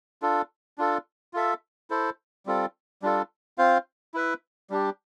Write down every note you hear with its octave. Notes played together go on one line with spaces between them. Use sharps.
D4 F4 A4
D4 F4 A4
F4 A4 E5
E4 A4 C5
G3 C4 F4 A4
G3 D4 F4 A4
C4 F4 C5 F5
E4 B4 E5
G3 D4 G4